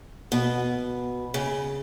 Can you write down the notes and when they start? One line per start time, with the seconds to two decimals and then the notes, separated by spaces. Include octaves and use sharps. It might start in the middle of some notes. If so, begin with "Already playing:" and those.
0.32 B2
1.34 C#3